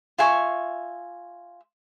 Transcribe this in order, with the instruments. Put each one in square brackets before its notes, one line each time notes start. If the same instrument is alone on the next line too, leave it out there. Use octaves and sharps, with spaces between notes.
[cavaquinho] F4 E5 G#5 C#6